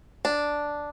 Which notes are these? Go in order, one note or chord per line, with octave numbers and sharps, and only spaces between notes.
D4